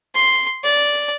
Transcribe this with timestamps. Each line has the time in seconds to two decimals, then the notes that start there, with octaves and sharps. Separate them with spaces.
0.15 C6
0.64 D5